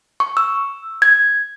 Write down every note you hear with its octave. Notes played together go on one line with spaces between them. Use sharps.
C#6
E6
G#6